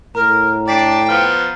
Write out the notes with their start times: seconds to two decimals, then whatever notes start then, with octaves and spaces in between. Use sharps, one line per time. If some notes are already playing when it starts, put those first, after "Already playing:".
0.15 A2 A#4 A#5
0.68 D5 G5 A5 A6 B6 C7
1.09 F3 B3 F6